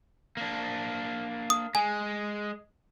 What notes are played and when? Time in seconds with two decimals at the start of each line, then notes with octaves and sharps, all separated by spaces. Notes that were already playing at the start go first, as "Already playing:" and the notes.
0.37 A#3 D4
1.50 D#6
1.75 G#3 G#5